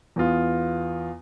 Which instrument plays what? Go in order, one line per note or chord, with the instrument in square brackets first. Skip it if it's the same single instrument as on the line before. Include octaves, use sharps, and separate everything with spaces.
[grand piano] E2 B3 F4